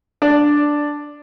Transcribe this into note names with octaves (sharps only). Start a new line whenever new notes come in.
D4